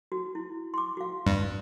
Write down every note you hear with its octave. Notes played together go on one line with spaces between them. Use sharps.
F#4
E4
C6 D6
F#4 F5
G2